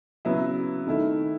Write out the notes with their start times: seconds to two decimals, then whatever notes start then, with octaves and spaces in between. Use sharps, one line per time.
0.25 C#3 F#3 B3 E4
0.87 D#3 A3 E4